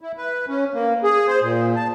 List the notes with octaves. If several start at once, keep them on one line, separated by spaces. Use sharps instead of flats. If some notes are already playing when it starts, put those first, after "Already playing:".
E4
B4
C#4
A#3
G#4
C5
A#2
A5